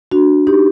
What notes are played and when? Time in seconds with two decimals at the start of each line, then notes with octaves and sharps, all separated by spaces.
0.12 D4 F#4
0.47 D#4 G4